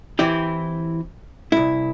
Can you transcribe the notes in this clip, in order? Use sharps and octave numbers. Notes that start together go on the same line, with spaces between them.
E3 C4 E4 G4
C2 E4